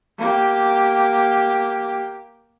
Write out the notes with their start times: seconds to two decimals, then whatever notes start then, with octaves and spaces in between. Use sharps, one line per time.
0.18 A#3 G4